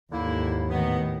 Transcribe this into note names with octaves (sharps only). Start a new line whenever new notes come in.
D#2 G#2 D3 A#3 E4
A2 D#3 B3